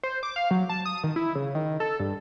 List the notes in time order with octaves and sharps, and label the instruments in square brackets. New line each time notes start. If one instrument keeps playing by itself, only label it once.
[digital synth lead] C5
D6
F5
F#3
A5
D#6
D#3
E4
C#3
D#3
A4
G2